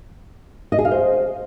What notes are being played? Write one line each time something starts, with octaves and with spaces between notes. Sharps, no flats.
D#5
G#4
F5
C5